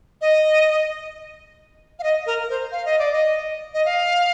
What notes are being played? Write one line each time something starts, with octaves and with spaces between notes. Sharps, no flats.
D#5
F5
D#5
A#4
C5
F5
D#5
D5
D#5
D#5
F5